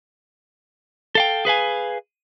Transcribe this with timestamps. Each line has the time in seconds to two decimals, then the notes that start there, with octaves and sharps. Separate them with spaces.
1.15 A4 F5 G5
1.45 G#4 B4 F5 G#5